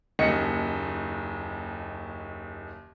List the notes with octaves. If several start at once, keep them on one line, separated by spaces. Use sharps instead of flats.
F#1 D#2 D#5 C#7